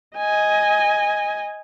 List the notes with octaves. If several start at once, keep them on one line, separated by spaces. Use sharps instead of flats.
D#5 G#5